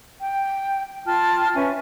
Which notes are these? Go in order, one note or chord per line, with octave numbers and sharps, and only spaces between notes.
G5
F4 G5 A5 F6
C#4 B4 E5 G#5